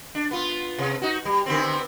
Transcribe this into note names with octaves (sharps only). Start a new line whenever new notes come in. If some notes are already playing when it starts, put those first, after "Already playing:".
D4
B3 F4
C3
D#4 F#4
G3
D3 B3 C4